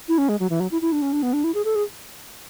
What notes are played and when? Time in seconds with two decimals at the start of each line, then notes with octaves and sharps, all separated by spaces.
0.08 E4
0.18 C#4
0.29 G#3
0.40 F#3
0.50 E3
0.60 F#3
0.71 E4
0.82 E4
0.92 D4
1.02 C#4
1.13 D4
1.23 B3
1.33 D4
1.44 E4
1.54 G#4
1.65 A4
1.75 G#4